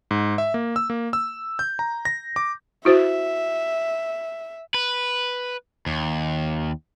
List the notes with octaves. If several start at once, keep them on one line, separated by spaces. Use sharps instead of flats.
G#2
E5
A#3
E6
A#3
E6
G6
A#5
A#6
D6
E4 F#4 C5 E5
B4
D#2